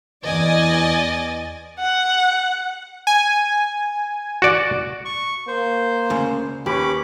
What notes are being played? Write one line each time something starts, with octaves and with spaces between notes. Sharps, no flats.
E2 D5 D#5 G#5 A6
F#5
G#5
F#4 D5
C#6
A#3 C5
D2 C#3
D#2 C#4 G4 B4 B5 C#6 D6